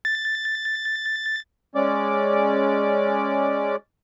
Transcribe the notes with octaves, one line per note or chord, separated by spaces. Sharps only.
A6
G#3 C#4 D5 D6